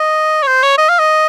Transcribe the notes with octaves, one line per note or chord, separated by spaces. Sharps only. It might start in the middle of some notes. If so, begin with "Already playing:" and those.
Already playing: D#5
C#5
C5
C#5
D#5
F5
D#5